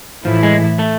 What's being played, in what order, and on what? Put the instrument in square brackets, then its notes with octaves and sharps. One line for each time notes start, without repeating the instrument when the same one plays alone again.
[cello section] A2 E3 A3 E4 [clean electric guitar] F3
[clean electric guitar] G#3
A3